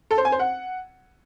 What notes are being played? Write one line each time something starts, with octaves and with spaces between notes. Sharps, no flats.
A4
C5
G#5
C5
F#5